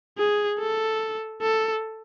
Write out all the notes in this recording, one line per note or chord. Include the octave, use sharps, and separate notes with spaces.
G#4
A4
A4